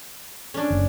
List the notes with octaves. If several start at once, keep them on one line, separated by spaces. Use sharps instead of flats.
C#4 D4
F#1